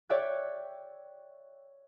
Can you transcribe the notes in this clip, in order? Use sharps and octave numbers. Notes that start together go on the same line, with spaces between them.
C#5 D5 E5 G5 F#6 G#6